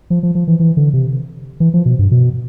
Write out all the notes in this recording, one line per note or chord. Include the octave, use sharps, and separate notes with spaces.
F3
F3
F3
E3
E3
D3
C3
E3
F3
B2
G2
B2